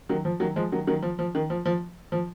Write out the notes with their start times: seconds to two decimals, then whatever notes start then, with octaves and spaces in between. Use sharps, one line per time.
0.09 D#3 F#3
0.25 F3
0.40 D#3 F#3
0.56 F3 G#3
0.72 D#3 F#3
0.87 D#3 F#3
1.02 F3
1.19 F3
1.35 D#3
1.50 F3
1.66 F3
2.12 F3